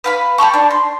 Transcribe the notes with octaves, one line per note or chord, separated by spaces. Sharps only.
B4 F5 B5
G4 A4 B5 C#6
D4
C6